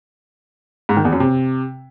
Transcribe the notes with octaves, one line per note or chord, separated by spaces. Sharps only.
G#2
D#3
E2
F#2
C3